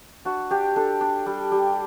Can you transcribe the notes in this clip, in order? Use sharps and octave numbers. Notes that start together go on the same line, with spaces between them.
D4 F#4
D4 G4
D4 A4
D4
G3
G3